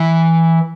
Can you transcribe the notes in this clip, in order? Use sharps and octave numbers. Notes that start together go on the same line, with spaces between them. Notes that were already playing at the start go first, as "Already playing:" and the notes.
Already playing: E3